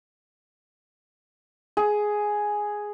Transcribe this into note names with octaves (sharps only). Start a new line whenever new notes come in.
G#4